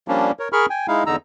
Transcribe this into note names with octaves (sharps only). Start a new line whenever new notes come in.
F3 G3 A#3 C#4 D4
A#4 C#5
G#4 A#4 B5 C#6 F6
G5 G#5
G#3 D#4 E4 F5
E2 D3 D#4 A#5 E6